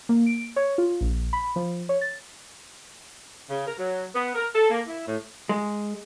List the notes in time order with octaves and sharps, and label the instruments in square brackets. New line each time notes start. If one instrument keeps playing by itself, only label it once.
[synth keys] A#3
D7
C#5
F4
A#1
B5
F3
C#5
A6
[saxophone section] C#3
A#4
F#3
B3
A#4
A4
A#3
E4
A2
[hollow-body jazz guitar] G#3